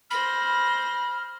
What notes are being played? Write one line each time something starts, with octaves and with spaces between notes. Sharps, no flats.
C5 B5 F6 A#6